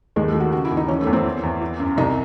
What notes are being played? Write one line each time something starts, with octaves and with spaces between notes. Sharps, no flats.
D#2 G#3
A3
D#3
F#4
C#3 F#4
E4
D#2
D#4
E3 C#4
A3
E2
C4
E3
E2
E3
F#2
C2 D#4